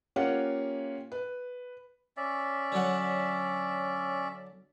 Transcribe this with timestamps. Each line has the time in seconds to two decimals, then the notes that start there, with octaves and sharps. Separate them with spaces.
0.16 A#3 C#4 F4 G4 C#5 F#5
1.12 B4
2.17 C#4 D5 E5
2.72 D3 F#3 F#5